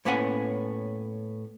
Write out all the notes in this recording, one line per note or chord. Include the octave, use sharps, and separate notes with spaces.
A2 A#3 B3 C#4 F#5 G#5